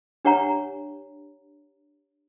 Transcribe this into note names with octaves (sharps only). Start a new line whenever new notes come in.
D4 G4 C#5 F#5 A#5